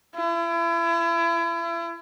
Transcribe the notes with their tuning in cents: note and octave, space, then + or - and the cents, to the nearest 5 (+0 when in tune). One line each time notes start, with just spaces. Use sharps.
E4 +35